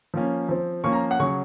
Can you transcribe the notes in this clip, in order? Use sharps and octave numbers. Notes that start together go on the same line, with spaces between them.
F3 A#3 C#4
F3 C4
F3 A#3 C#4 C#6
A#5
F#5
C#3 F#3 C#4 C#6